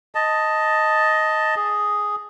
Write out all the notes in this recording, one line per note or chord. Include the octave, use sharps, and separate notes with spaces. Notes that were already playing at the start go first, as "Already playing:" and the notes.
D#5 A5
G#4